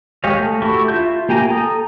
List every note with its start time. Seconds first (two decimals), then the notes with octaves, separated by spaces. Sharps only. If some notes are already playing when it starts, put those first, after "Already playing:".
0.24 G#3 G4 C#5 D#5 F5
0.40 A3
0.62 E4 F#4 G4 A4 C#6
0.88 F4 E5 G6
1.29 A#3 G4 G5 G#5 A#5
1.49 A4 A#5 D#6